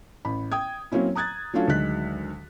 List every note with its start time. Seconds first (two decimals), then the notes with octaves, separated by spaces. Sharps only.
0.25 A1 B5
0.52 G5 D#6 G#6
0.92 F#3 A#3 C4 C#4 E4
1.15 A#5 D#6 F#6 G#6 A6
1.54 F#3 A3 C#4 D4 F4 F#4
1.68 D2 D#3 F#3 G#3 F#6 B6